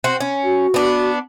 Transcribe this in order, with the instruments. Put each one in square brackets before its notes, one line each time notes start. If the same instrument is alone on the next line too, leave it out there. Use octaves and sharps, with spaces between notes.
[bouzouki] C4 F#4
C#4
[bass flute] F#4
[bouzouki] B3 D4